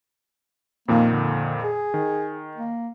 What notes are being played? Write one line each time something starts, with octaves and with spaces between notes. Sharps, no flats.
F2 A#2 D#3 A#3
D3
G#4
D#3
A#3